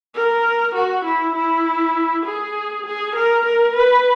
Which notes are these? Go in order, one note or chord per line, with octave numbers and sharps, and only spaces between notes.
A#4
F#4
E4
E4
G#4
G#4
A#4
A#4
B4